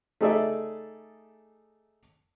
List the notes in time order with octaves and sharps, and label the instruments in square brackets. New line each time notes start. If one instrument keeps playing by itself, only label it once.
[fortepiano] A3 D#4 G#4 A4 D5 E5